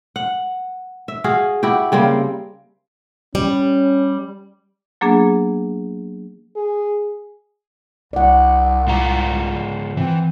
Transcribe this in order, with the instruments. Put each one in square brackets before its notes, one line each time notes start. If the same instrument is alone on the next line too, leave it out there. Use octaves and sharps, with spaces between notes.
[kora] F#5
E5
F#4 G#4 F5
E4 F#4 G4
C#3 G3 A#3 C4
[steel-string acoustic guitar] G3 [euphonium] C#4
[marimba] F#3 A#3 B3 D4 G#4
[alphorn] G#4
[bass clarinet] C2 [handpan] D5 F#5
[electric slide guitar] G#2 F4 A#5
[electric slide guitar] E3 [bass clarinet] C4